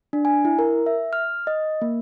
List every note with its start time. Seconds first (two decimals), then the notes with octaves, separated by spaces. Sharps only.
0.13 D4
0.25 G#5
0.45 E4
0.59 A#4
0.86 E5
1.13 F6
1.47 D#5
1.82 A#3